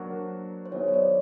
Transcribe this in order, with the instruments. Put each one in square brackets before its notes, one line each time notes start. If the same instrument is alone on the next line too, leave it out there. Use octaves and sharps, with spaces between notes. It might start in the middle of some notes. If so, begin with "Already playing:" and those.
Already playing: [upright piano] F#3 A#3 D4 F#4 [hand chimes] C5
[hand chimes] C5
[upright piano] D#3 F#3 B3 E4 G#4 [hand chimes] C#5
[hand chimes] C#5
D5